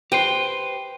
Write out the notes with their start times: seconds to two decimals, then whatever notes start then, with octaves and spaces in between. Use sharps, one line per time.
0.12 G4 B4 C5 G5